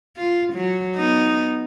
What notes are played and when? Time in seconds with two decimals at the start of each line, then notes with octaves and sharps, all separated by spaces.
0.16 F4
0.53 F#3
0.97 B3 D#4